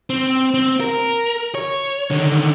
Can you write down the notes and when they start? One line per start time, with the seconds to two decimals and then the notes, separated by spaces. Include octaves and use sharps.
0.10 C4
0.54 C4
0.80 A#4
1.55 C#5
2.10 D3 D#3